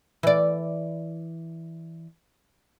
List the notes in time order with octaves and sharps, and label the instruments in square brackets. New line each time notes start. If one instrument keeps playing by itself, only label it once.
[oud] E3 D5